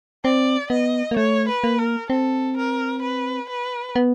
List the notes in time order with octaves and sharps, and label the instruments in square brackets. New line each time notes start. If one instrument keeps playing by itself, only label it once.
[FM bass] C4 [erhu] D5
[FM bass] B3 [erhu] D#5
[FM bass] A#3
[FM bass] A3 [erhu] C#5
[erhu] B4
[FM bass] A#3
[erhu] A#4
[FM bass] C4 [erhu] A4
[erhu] A#4
B4
B4
[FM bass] B3